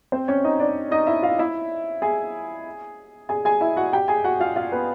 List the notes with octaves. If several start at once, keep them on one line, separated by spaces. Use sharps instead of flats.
C4 C5
C#4 C#5
D#4 D#5
D4 D5
D#4 D#5
E4 E5
F4 F5
E4 E5
G#4 G#5
G#4 G#5
G#4 G#5
E4 E5
F#4 F#5
G4 G5
G#4 G#5
F#4 F#5
F4 F5
F4 F5
B3 B4